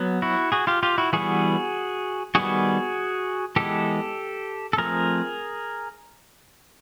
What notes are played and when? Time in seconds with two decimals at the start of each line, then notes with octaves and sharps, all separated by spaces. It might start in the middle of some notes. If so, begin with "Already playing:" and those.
Already playing: F#3 B3
0.22 E4 F#4
0.52 F#4 G#4
0.67 F4 G4
0.83 F4 G4
0.98 E4 F#4
1.13 E3 G3 B3 F#4 G#4
2.35 D#3 G3 B3 F#4 G#4
3.56 E3 G#3 B3 G4 A4
4.73 A4
4.78 F3 A3 C4 G#4 A#4